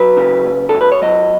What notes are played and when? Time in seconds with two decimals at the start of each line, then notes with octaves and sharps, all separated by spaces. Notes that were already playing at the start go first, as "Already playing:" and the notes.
Already playing: F#3 B4
0.17 C#3
0.46 F#2
0.69 F#2 A4
0.81 B4
0.92 C#5
1.02 F#3 D#5